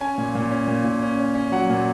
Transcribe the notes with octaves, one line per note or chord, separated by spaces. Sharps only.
C#4 G#5
A#2
A#2
C#4
A#2
A#2
C#4
C#4
C#4
F#3 F#5
A#2